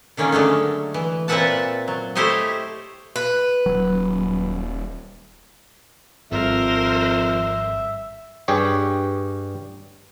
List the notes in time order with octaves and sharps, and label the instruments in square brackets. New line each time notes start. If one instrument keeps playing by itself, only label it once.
[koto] D3 D#3 A#3 C#4
D3 F#3 G#3 A3
E3
A#2 C4 B4 E5 F#5 A5
F#3
A3 E4 G4 C5 C#5 D#5
[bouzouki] B4
[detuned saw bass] D#1 [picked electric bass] F#3
[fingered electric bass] G#1 G3 [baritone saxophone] F2 [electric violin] A#4 C5 [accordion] E5
[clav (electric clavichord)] G2 G3 G4 G#4 C#5